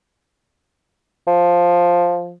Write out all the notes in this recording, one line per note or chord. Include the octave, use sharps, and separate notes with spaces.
F3